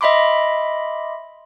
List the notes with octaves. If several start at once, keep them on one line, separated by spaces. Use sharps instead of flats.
D#5 E5 B5 C6 D6